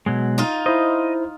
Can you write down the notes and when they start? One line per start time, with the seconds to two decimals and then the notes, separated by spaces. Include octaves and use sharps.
0.06 B2 F#3 G#3
0.38 D#4 F4
0.66 E4 C5 D#5